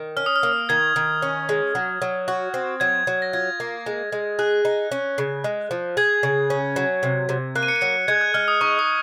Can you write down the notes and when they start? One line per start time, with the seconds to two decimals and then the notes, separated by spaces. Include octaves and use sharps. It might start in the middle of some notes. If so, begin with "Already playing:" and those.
Already playing: D#3
0.17 C#4 F6
0.26 D#6
0.36 F6
0.43 A#3
0.69 D#3 G#6
0.96 D#3
1.22 C#4
1.49 G#3
1.75 F#3
2.02 F#3
2.28 F#4
2.54 C4
2.80 F#3 G#6
3.07 F#3
3.22 A#6
3.33 F4 G#6
3.60 A#3
3.86 G#3
4.12 G#3
4.39 G#4 F#6
4.65 D#4
4.92 C#4
5.18 C#3
5.44 G#3
5.71 F3
5.97 G#4 G#6
6.23 C#3
6.50 C#4
6.76 F#3
7.03 C3
7.29 C3
7.55 A#3 F#6
7.63 D#7
7.68 C#7
7.76 D#7
7.81 F#3 C#7
8.08 G#3 G#6
8.21 F#6
8.34 G#3 F6
8.48 D#6
8.61 D#4 C#6
8.79 D#6